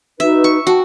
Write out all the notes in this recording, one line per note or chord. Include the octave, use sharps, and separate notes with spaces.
D#4 F#4 B4 E5
C#6
F#4 G5 A5 C#6